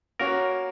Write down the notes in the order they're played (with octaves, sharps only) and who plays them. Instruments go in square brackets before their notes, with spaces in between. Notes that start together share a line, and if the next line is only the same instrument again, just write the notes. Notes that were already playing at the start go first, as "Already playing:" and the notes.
[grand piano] A#3 C#4 F#4 C#5 [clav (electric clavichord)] A#4